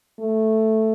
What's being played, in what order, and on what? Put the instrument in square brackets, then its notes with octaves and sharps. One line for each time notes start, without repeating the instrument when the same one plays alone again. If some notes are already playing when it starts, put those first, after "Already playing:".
[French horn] A3